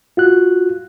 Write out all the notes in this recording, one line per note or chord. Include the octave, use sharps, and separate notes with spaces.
F4 F#4 F#6